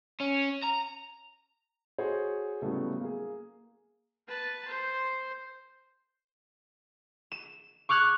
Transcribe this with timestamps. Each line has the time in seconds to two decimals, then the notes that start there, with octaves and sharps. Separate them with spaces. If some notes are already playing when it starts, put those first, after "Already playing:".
0.20 C#4
0.63 A#5
1.98 F#4 G#4 A4 C5 C#5
2.62 A2 C#3 F#3 G3 A3 B3
3.00 A#3 G#4
4.27 B4 A5
4.67 C5
7.32 E7
7.89 C#6 D6 F6 F#6 G#6